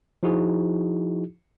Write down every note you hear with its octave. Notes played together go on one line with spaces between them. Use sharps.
F3 D#4 E4 F#4 G#4